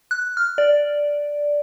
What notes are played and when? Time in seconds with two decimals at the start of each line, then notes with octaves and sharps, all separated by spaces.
0.11 F#6
0.37 F6
0.58 D5